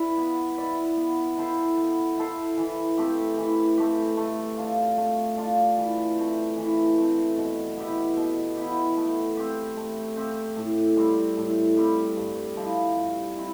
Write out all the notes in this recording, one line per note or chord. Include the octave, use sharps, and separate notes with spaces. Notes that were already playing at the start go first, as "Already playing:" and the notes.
Already playing: E4 B4 D5
B3
E4 B4 D5
B3
E4 A4 C5
B3
E4 A4 C5
E3
A3 C4 G4
E3
A3 C4 G4
A3
D4 F4
A3
D4 F4
E3
A3 C4
E3
A3 C4
B2
B3 E4 G4
B2
B3 E4 G4
A3
C4 G4
A3
C4 G4
A2
G3 C4
A2
G3 C4
G2
F3 C4 E4
G2
C4 E4